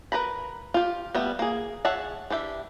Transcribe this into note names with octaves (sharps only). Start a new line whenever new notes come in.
A#4 B4 A#5 B5
F4 G4
G3 A3 B3
A#3 G#4
G#4 C#5 E5 F#5 A5
E3 D4 G4 E5